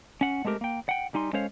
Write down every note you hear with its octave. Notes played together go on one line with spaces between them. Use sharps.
C#4 F#5
G#3 A3 C4 G4 A#4
A#3 G5
F#5 G5
G3 D#4 G#5 C6
G#3 C#4 A4 C5 C#5 F5